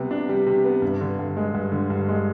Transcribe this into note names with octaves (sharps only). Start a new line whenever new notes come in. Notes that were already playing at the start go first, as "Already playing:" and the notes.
Already playing: C3 G3 B3
D4
G3
C3
B3
G2
D3
G2
G#3
G2
D3
G2
G#3